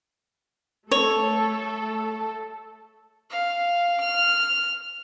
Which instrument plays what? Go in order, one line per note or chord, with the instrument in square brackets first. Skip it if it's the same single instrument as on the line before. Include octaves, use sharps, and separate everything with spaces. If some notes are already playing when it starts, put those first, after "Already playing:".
[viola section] A3 A4 [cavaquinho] C#5
[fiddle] F5
F6